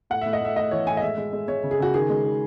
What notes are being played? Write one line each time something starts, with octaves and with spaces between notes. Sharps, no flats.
A2 F#5
A2 E5
D#5
A2 E5
A2 D#5
E3 C#5
A2 G#5
D#5
G#3 E5
G#3
G#3
G#3 C#5
C#3
G#4
C#3 F#4
D#3 G#4
G#3
D#3